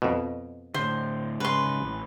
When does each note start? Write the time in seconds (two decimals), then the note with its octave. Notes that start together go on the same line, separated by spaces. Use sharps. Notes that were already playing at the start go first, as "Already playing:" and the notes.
0.02 F2 B2
0.74 A2 D3 C5
1.40 G#2 C#3 B4 C6
1.80 A1